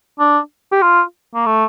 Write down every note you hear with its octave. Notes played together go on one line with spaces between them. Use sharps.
D4
G4
F4
A#3
A3